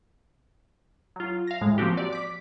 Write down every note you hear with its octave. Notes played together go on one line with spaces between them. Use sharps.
F#3 F4
F5 A#6
A2 G#3
F3 A#3 C4 F#4 G4
D5
D6 B6